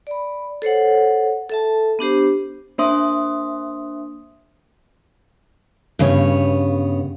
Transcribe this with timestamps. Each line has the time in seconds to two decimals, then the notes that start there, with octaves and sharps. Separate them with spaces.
0.07 D5 B5
0.62 A4 C5 C#5 F#5
1.50 A4 E5 A5
1.99 B3 D4 G4 C5
2.78 A#3 D4 C5 E5 C6 D#6
5.99 G2 C#3 B3 C#5